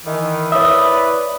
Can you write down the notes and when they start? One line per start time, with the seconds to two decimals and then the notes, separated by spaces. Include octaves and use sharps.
0.05 D#3 E3
0.52 E4 B4 C#5 D5 E5 D#6